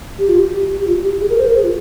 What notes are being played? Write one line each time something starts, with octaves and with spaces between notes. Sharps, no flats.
G4
F4
G4
G4
F4
G4
G#4
A#4
C5
A#4
G#4
F4